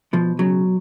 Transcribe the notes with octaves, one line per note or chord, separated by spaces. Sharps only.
B2 F3
C#3 F#3